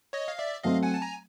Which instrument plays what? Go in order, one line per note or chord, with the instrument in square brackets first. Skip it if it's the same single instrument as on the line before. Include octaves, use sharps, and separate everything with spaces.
[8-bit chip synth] C#5 D#5
F5
D5 E5
[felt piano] F#3 A3 C4 [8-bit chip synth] D#5 F5
[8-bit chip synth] F#5 G#5
A5
G#5 A#5